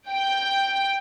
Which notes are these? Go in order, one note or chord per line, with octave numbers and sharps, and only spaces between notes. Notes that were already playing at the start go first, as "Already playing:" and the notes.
G5